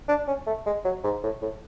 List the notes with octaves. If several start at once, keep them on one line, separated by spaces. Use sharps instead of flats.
D4
C#4
A3
G#3
F#3
G#2
A2
A2